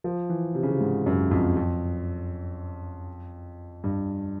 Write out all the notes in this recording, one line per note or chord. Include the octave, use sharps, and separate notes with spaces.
F3
E3
C3
C#3
C3
G#2
F#2
F2
F2
G2